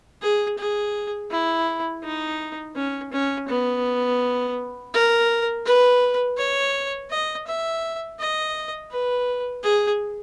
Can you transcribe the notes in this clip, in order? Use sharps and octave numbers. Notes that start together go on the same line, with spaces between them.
G#4
G#4
E4
D#4
C#4
C#4
B3
A#4
B4
C#5
D#5
E5
D#5
B4
G#4